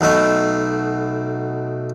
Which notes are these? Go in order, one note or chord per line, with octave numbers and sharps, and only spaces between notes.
B1 B2 A3